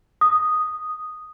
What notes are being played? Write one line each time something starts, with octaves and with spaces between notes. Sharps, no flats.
D#6